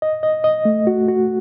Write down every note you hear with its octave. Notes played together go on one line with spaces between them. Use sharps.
D#5
D#5
D#5
A3
F#4
F#4